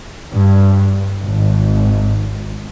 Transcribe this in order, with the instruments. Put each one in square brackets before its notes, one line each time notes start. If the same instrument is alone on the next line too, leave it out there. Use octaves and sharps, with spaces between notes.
[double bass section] G2
G#1